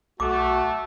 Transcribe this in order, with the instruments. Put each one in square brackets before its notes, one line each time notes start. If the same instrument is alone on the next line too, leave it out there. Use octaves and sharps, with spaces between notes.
[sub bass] B1 [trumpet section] A3 [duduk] F#4 [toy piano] D6